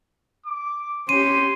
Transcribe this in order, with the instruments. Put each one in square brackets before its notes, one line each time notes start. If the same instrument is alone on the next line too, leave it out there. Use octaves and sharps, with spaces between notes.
[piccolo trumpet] D6
[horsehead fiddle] C#4 G4 [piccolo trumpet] C6 [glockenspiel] D#7